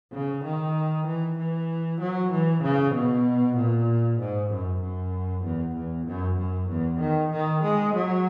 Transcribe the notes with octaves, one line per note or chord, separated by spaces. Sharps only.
C#3
D#3
E3
E3
F#3
E3
C#3
B2
A#2
G#2
F#2
F#2
E2
E2
F#2
F#2
E2
D#3
D#3
G#3
F#3